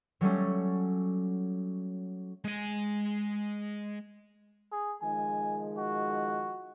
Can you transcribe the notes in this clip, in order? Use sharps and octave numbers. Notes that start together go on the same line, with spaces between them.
F#3 G3 A3 C#4
G#3 G#5
G#4
D#3 F3 G#3 G#5
F#4